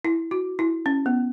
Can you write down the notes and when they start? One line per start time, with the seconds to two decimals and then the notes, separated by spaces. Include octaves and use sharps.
0.05 E4
0.31 F#4
0.59 E4
0.86 C#4
1.06 B3